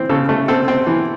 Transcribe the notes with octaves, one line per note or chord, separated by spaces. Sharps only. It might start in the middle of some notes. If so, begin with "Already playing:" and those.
Already playing: E3 C4
C#3 A4
A3
C4 A4
C4
E3